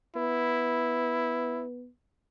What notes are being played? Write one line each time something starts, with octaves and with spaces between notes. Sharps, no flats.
B3 E4